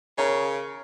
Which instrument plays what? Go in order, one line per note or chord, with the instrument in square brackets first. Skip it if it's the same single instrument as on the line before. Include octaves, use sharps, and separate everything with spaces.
[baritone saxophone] C#3 [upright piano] A#4 C#5